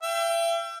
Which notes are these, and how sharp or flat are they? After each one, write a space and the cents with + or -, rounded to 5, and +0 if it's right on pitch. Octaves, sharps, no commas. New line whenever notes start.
E5 +40 G5 +0